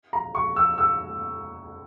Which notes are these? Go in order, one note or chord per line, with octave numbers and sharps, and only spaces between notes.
A#5
C#6
E6
E6